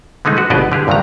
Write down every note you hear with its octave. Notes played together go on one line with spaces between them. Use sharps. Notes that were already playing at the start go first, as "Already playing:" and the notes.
D3 G#3 A3 D#4
F#4 B4
G1 B2 B3 G#4 D5 D#5
D3 G4 G#4
A#1 G2 D3 D#3 A#3 A#5